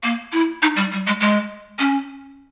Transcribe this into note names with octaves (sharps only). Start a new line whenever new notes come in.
A#3
E4
D#4
G3
G3
G#3
G#3
C#4